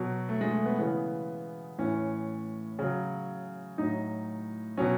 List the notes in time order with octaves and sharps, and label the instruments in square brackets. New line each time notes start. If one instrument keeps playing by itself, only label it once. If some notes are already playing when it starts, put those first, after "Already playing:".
Already playing: [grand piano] B2 F#3
A3
G#3
A3
B3
C#3 E3 B3
A2 E3 C#4
C#3 F#3
A2 F#3 D#4
B2 F#3 C#4